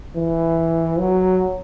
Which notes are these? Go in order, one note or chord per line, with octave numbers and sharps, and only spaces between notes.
E3
F#3